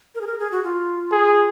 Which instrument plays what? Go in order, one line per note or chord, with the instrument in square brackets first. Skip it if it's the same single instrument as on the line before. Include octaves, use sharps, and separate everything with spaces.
[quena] A#4
G#4
A#4
G#4
F#4
F4
[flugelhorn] G#4